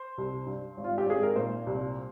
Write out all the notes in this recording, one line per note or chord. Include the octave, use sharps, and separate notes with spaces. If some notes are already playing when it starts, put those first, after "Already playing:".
Already playing: C5
C2
G2
G#1
F4
G4
G#1 G#4
A#4
A#2 C5
C2